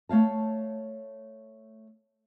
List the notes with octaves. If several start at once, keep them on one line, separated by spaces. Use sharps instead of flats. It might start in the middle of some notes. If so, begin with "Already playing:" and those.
A3 C#5 F5 A5